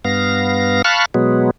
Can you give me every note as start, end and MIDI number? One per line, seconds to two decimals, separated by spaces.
0.05 0.82 43
0.05 0.82 59
0.05 0.82 77
0.05 0.82 94
0.85 1.05 77
0.85 1.05 81
0.85 1.05 83
0.85 1.05 85
0.85 1.05 89
0.85 1.05 90
1.14 1.51 47
1.14 1.51 54
1.14 1.51 56
1.14 1.51 59